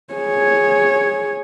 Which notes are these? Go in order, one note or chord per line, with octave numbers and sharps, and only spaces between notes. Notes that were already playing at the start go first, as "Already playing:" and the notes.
G#4 C#5